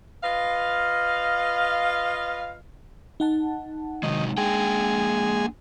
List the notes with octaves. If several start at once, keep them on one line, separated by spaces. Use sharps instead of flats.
F4 B4 D#5 F5
D#4 F#5 A5
C3 D#3 F#3 G#3
G#3 A#3 D4 G#4 G5